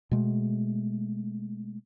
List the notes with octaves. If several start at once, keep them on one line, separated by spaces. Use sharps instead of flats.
B2 G#3 A3